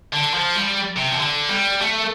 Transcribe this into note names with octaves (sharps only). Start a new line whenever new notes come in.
D3
F3
G3
C3
F3
D3
G3
A3